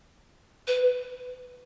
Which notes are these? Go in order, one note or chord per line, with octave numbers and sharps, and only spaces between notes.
B4